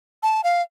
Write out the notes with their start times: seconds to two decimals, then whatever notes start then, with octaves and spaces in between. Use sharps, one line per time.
0.23 A5
0.44 F5